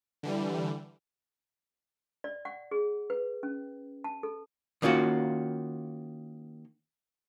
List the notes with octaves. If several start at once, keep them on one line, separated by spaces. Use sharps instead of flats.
D3 E3 G3
D5
F#5
G#4
B4
C#4
A5
A4
D#3 A#3 C#4 F4 F#4